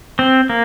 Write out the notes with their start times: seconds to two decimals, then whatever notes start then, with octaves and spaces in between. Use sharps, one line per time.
0.19 C4
0.50 A#3